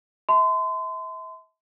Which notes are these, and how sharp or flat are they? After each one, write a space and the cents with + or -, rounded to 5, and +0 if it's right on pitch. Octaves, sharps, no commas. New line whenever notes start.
E5 -35 A5 +0 C6 -35